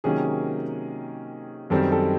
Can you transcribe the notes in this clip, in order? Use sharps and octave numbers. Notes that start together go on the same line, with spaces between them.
C3 D#3 F#3 A#3 C#4 G#4
F#2 D#3 G3 C4 D#4 A4
A4